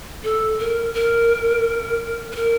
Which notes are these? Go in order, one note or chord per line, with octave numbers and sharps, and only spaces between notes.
A4
A#4
A#4
B4
A#4